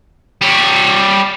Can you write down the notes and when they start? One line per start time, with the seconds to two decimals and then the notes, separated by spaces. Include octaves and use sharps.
0.41 G3 C#5